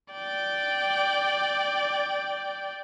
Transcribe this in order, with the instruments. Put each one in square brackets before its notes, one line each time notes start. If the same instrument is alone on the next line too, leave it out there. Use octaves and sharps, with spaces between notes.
[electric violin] D5 G5